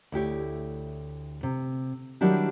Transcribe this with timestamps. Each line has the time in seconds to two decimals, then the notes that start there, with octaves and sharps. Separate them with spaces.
0.12 D2 E4 G4 C#5
1.43 C3
2.21 D#3 F#3 G3 D4 E4 G4